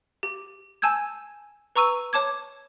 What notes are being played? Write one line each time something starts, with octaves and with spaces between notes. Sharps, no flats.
G4
G#5 A5 E6 G6 G#6
B4 A#5 C#6 E6 D#7
C#5 A5 D6 G#6